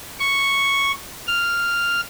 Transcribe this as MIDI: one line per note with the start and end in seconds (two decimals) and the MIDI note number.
0.20 0.91 85
1.27 2.01 89